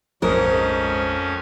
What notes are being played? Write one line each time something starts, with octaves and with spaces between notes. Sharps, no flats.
A#1 F2 G#2 C#4 A#4